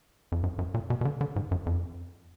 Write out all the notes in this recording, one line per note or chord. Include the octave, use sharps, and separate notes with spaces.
F2
F#2
F#2
A#2
B2
B2
D3
D3
G#2
F#2
F2